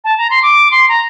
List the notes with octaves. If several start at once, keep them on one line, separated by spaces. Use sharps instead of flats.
A5
A#5
C6
D6
C6
A#5